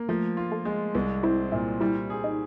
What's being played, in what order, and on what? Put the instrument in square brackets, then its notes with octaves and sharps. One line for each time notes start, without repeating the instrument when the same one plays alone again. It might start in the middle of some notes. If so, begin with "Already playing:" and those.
Already playing: [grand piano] A#3
[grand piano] F3 [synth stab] A3
[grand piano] F4
[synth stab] A3
[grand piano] G#3
[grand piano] C2 [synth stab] B3
[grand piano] C4 [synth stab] E4
[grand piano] A#2 [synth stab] E4
[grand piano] G3 [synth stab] E4
[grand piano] G#4
[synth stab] D#4